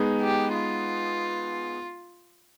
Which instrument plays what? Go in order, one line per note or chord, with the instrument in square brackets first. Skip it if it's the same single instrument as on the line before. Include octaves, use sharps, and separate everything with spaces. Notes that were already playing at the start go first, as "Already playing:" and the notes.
Already playing: [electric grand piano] G#3 B3 D#4 G#4
[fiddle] G4
F4